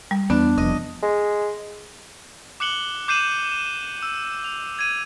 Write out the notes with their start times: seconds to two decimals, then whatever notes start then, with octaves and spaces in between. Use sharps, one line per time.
0.11 G3
0.30 E2 B3 D4
0.58 F1 F2 D#5
1.02 G#3
2.60 D6 F#6 C#7 F#7 G7
3.08 D6 G6 C7 D#7 E7 F#7
4.02 E6
4.44 F7
4.79 G#6 D#7